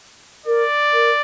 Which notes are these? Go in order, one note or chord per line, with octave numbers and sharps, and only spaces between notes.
A#4 D5
A#4